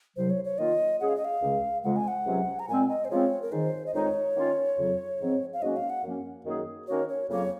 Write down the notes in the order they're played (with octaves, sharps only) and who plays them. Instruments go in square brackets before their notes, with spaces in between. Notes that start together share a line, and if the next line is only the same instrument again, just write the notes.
[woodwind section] C2 C3 F#3 [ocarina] C5
[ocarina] C#5
C#5
[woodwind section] D#3 A#3 F4 [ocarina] D#5
[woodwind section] C#3 G#3 C#4 G#4 [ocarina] F#5
[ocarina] F5
D#5
F5
[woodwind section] C#2 C#3 G#3
[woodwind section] F2 C#3 G#3 [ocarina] F#5
[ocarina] G#5
F#5
[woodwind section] C#2 C3 F#3 C#4
[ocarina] A#5
[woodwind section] A#2 G#3 C4 [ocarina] G#5
[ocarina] D#5
C5
[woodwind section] C#3 F3 G#3 C4 F4 [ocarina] C#5
[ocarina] A#4
[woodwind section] G#2 D#3 G#3 [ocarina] C5
[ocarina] D#5
[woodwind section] F2 D#3 G#3 D#4 [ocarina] C#5
[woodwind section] D#3 A#3 C#4 F4
F2 C#3 F#3
G#2 F3 C4
[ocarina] F5
[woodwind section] G#2 F#3 A#3 C#4 F#4 [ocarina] D#5
[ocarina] F5
F#5
[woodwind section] F#2 F3 A#3 C#4
F#2 D#3 A#3 D#4 G#4
[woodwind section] D#3 A#3 C#4 F#4 A#4 [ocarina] C#5
[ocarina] C#5
[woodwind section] F2 C#3 F#3 A#3 [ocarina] C#5